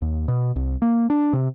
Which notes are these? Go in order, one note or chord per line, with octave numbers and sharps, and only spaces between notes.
D#2
B2
C2
A#3
D4
C3